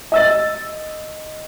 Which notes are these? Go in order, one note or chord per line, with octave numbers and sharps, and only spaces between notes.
D#5 E6 A6